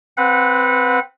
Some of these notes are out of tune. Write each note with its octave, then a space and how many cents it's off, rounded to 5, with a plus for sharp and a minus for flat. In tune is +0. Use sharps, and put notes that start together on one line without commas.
C4 +0 B4 +0 F#5 -25